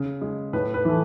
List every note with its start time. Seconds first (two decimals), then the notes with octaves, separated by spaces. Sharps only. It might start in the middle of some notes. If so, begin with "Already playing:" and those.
Already playing: C#3
0.21 G#3
0.53 A2 B4
0.74 B4
0.85 E3 A3